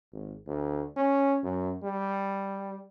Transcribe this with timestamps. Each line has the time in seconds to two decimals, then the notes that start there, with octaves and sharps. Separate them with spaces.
0.12 G#1
0.47 D2
0.97 C#4
1.44 F#2
1.83 G3